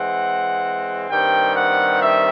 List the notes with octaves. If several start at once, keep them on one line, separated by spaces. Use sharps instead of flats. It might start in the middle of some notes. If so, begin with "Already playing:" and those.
Already playing: E3 G#3 C4 F#5
G2 D#3 G3 C4 G5
F#5
E5